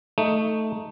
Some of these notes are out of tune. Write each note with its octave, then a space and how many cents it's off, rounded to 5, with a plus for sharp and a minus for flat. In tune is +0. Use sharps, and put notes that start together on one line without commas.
A3 +5 D#4 +0